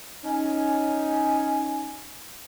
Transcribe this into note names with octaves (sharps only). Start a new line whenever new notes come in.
C#4 D#4 G#5